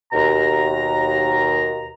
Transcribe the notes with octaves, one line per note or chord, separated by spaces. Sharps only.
D#2 B2 A#5